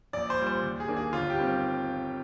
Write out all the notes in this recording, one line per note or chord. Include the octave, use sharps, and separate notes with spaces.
A#1 D5
C5
A#2 G3
C5
D#2
G#4
D#3 A#3 D4
G#4
G1 F4
G4
D#3 G3 C4